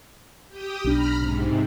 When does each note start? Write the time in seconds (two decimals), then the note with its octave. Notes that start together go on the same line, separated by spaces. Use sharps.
0.48 G4 G5 D#6
0.84 B1 D4 A#5 B5 F6
1.18 G#2 C3